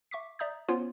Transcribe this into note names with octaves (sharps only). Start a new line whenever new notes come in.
E5 C#6 D6 B6
D5 E5 A#5 D#6 G6
B3 C#4 F4 C5 C#5